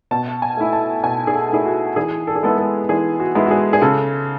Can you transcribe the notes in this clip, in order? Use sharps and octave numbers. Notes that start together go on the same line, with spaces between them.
B2 A5
G#5
A3 E4
A5
B2 G#5
G#4
A4
A3 E4 G#4
F#4
E3 G#4
A4
G#4
G#3 B3 E4 A4
A4
E3 G#4
F#4
G#3 B3 E4
F#4
G#4
G#4
C#3 A4